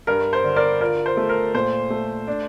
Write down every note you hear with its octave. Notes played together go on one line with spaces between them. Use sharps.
G2 A#4
C5
D3
A#4 D5
F4 A#4 D5
C5
A3
A#4
A#2 C5
A3
D4